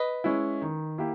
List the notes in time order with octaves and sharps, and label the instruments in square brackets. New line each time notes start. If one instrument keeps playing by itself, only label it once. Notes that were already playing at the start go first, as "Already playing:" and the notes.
Already playing: [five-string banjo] B4 D#5
[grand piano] G#3 C#4 E4
D#3
A#3 E4 G4